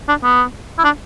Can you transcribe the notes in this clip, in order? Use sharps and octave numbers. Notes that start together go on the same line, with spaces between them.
D4
B3
E4
D4